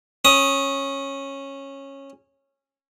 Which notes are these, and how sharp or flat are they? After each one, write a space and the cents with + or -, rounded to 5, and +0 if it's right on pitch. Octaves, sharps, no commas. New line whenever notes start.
C#4 -15 D#6 +10